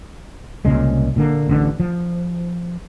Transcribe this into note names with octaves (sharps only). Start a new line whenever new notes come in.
C2 A#2 C#3 G#3
A#2 D3 A#3
A1 D3
F3